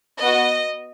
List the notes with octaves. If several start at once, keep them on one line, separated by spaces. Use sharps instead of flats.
B3 F#4 D#5